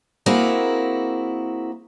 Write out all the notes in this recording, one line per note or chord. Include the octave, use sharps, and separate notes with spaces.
A#3 C4 E4 F#4 G#4 A#4